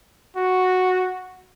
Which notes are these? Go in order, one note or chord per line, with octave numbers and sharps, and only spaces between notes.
F#4